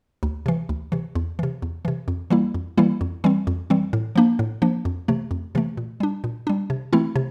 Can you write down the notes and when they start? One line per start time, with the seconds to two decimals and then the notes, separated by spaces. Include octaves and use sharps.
0.23 D2
0.46 C3 E3
0.69 D2
0.92 C3 E3
1.15 E2
1.39 C3 E3
1.62 E2
1.85 C3 E3
2.08 F2
2.30 E3 G3 A#3 E4
2.54 F2
2.78 E3 G3 A#3 E4
3.01 F2
3.24 E3 G3 C4
3.47 F2
3.70 E3 G3 C4
3.93 A2
4.16 F3 A#3 D4
4.39 A2
4.62 F3 A#3 D4
4.85 F2
5.08 C3 E3 A3
5.31 F2
5.55 C3 E3 A3
5.77 A#2
6.00 G3 D4
6.24 A#2
6.47 G3 D4
6.70 C3
6.93 E3 A3 C4 E4
7.16 C3